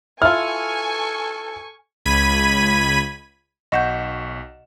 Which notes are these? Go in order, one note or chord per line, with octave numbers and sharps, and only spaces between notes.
E4 F4 A4 G#5 C#6 F6
C#2 B5 G#6 B6 D#7
B1 D#5 F#5 C#6 G6 E7